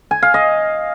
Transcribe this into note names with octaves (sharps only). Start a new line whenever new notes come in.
G#5
F5
D#5